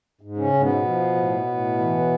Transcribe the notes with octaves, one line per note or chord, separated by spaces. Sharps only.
G#2
C#3 C#4
G#2
B2 B3
F3
A2
A2
E3